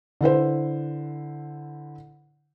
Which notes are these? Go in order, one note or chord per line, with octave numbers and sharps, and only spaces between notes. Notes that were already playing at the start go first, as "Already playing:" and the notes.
D3 E4 B4 C5